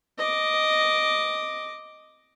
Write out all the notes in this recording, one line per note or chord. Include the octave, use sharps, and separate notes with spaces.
D#5 D6